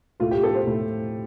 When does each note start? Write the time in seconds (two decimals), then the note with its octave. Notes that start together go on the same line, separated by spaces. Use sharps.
0.20 A2 A3 F4
0.31 G4
0.43 A4
0.55 C5
0.67 A2 A3